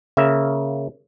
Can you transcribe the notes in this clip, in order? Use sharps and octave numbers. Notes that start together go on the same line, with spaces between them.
C#3 A#3 E5